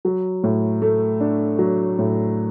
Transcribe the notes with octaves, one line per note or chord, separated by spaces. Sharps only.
F#3
A2
A3
D4
F#3
A2